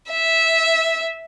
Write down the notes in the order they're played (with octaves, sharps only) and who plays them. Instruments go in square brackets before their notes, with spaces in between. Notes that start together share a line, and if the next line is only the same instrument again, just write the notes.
[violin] E5